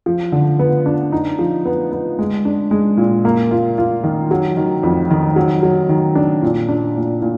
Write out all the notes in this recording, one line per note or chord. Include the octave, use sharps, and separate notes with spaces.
F3
D3
B3
D4
D#4
F3
B3
B3
G#3
D4
G#3
A#2
A#3
F4
F4
D#3
F#3
D#3
F2
D#3
F#3
F#3
D#3
D4
A#2
D4
A#2
A#2